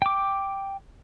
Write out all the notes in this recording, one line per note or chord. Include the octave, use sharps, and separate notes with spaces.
G5 D6